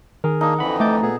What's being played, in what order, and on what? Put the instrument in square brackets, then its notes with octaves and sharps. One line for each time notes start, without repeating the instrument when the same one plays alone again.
[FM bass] D#3 [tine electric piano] G#4 A#4
[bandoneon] A#3 D4 [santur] D#4
[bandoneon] F2 D3 E3 [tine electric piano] F#5 B5
[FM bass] A3 [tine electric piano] D#5 D6 G6 [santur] A5
[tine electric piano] A#2 B3 A4 [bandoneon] G#4